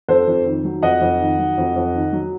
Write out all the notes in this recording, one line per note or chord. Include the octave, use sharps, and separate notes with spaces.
F2 A4 C5
F2
D#3
F#3
F2 D#5 F#5
F2
D#3
F#3
F2
F2
D#3
F#3